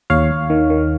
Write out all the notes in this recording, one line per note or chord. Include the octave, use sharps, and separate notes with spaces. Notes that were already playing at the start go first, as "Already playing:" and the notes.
D#2 C#5 F5
D#2
D#3
D#3